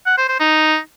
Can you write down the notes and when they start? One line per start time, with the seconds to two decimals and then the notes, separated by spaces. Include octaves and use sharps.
0.06 F#5
0.18 C5
0.29 C5
0.40 D#4